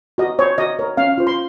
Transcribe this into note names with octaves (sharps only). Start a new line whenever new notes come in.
F#4 D#5
C5 C#5
F#4 D#5
A#4 C#5
C#4 F5
F4 C5
C6